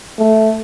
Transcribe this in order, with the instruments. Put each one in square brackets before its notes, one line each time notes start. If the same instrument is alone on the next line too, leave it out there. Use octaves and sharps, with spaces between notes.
[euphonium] A3